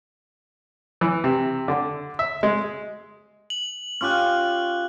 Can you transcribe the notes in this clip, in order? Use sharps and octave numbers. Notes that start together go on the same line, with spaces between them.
E3
C3
D3
E5
G#3
F#7
C#4 F4 G4 F6 F#6